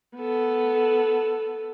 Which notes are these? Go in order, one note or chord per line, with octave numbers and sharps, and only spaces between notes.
B3 A4